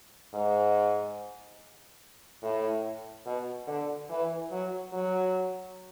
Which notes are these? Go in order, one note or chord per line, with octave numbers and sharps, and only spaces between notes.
G#2
A2
B2
D3
E3
F#3
F#3